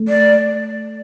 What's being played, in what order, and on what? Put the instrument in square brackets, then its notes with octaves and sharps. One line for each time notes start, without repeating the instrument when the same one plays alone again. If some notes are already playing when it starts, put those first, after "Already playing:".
Already playing: [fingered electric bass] A3
[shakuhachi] D5